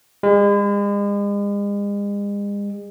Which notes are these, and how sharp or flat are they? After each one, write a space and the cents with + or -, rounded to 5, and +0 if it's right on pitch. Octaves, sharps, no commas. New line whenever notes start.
G#3 -40